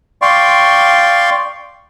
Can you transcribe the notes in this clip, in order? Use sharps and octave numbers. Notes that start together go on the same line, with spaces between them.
D5 F5 G5 C6 C#6